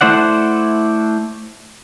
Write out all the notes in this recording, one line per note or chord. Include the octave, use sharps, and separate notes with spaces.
A3 E4 C5 D5 F#5